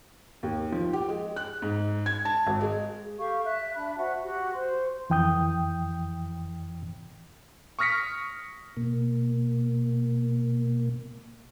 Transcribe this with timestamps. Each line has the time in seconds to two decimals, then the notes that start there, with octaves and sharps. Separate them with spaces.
0.43 D#2
0.72 F3
0.93 G4
1.08 G#3
1.36 F#6
1.62 G#2
2.06 G#6
2.25 A5
2.47 G#1
2.61 G#3
3.19 G4 A4 F5 C#6
3.45 E5 F#6
3.76 D4 B5
3.97 F#4 C5 E5 F#5
4.22 F#4 G4
4.54 C5 C6
5.10 F2 E3 G5 D#6 G6
7.79 C#6 D#6 F6 A#6 B6 C#7
8.77 B2 A#3